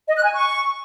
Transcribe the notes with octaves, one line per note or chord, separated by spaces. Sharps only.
D#5
F#6
G#5
C#6